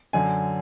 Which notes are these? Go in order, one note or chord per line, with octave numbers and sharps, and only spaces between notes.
F#2 D3 G#5